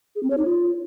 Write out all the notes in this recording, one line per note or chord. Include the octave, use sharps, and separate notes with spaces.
G#4
C4
C#5
D#4
F4